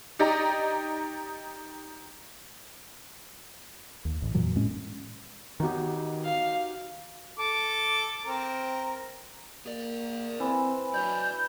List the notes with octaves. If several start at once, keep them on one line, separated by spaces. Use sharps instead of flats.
D#4 G4 D5 D#5 A#5
D#2
A1
F2 A#2 E3 F#3
A2 G#3 C#4
D#3 B3 D#4 F#4 G4
F5
A4 D6
C4 A#4
A#3 G#4 D5
E3 C4
F#3 D4 C#5 D5 G6